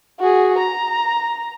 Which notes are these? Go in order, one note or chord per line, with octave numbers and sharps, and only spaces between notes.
F#4 G#4
A#5